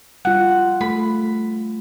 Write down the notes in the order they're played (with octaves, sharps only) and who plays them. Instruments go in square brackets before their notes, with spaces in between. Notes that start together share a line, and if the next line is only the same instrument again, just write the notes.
[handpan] G3 F4 [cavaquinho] F#5
[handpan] A3 A4 [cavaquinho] B5